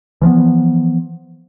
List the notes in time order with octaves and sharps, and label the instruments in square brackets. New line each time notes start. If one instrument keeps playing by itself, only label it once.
[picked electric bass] E3 F3 A3 B3